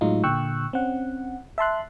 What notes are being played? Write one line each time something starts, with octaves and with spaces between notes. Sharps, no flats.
A2 F#3 G#3 D#4 F4
A#2 D3 G5 C#6 E6 F#6
C4 C#4 F#5
E5 A5 C6 F#6